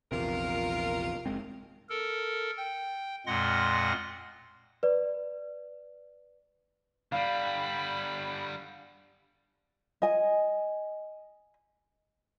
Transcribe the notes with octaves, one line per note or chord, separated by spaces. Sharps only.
A#1 E2 C3 F4 A#4
F#1 G#3 C4
A4 A#4
G5
F2 A#2 G#3 F#5 C6 A#6
B4 D5
D3 G3 F5 B5
D#5 G#5